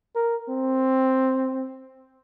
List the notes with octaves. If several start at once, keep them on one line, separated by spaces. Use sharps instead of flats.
A#4
C4